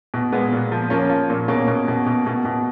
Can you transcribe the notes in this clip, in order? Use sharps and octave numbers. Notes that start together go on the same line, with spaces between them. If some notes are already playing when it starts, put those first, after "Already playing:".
B2
A#2 G#3 B3
A#2
F3
F3 A#3 C#4
F3
A#2
B2 A#3 C#4
B2
B2
B2
B2
B2